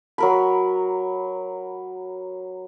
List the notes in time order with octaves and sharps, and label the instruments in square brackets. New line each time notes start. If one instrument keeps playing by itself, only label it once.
[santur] F#3 A#4 B5